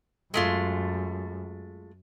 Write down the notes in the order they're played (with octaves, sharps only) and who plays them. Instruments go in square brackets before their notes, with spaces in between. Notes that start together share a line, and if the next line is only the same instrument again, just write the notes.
[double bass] F#2 [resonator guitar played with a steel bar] G#3 A3 F4